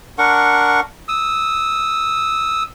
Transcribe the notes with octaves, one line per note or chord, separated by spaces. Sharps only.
D4 A#4 F#5 C#6
D#6 E6